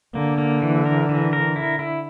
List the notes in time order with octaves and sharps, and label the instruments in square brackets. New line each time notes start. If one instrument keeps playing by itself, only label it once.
[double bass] D3 [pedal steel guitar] A#3
[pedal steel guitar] A#3
E3
A#4
E3
A#4
E4
E4